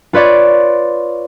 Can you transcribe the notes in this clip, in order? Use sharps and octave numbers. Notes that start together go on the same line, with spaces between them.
F4 B4 C#5 D5